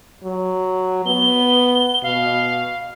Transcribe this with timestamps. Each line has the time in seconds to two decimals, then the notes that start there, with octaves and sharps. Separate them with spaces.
0.24 F#3
1.06 B3 G7
2.03 B2 F5